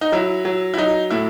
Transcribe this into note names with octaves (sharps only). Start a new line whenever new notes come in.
D#4
F#3 E4
F#3
E4
F#3 D#4
A2 E4